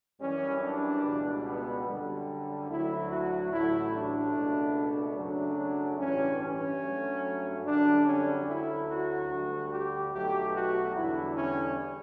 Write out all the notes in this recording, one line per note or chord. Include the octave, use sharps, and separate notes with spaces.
F#2 E3 G3 C#4
D4
C#2 B2 G3
B3
F#2 D3 G3
D2 D3 F#3 A3 E4
F#4
A1 A2 F#3 A3 E4
D4
C#2 B2 A3
F#2 C#3 F#3 A3 D4
A1 G2 E3 G3 C#4
C#4
G2 F#3 A3
F#2 D3 G3 D4
C#4
D2 D3 F#3 A3 E4
F#4
D2 D3 G3
G4
B1 B2 F#3 A3 G4
F#4
E2 D3 G3 E4
C#4